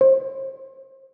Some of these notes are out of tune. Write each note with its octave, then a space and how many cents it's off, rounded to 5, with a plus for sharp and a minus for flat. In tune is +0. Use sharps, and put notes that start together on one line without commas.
C5 +35